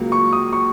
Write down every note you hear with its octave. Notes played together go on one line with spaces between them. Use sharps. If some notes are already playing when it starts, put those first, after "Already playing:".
Already playing: C#2 C#3 F#3 A#3
C#6
D#6
C#6